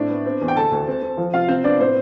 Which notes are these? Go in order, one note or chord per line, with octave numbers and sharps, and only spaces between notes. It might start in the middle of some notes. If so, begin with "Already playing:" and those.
Already playing: A2 C4 D4 D5
B3
C4
E2
G5
D2 A4 A5
D2
C4
C4
F3
C3 F4 F5
C3 C4 C5
B3 D4 D5
A2 C4 C5